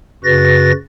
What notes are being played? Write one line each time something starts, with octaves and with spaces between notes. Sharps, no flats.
F#2 C#3 F#4 B4 A6 A#6